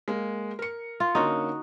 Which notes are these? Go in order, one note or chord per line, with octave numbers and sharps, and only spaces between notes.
G#3 A#3
A#4 C#7
F4
D3 A#3 C#4 D#4 F#4